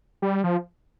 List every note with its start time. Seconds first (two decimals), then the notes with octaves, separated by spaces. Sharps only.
0.22 G3
0.44 F3